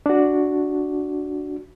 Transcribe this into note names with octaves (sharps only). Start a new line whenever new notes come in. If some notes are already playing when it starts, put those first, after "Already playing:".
D4 F#4